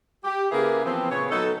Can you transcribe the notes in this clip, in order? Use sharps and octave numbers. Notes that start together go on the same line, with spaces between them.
G4
C#3 A#3 E4 G#4 A#4 B4
E3 F3 B3 C4
A#2 C#3 B3 C#5
F#3 B3 D#4 A4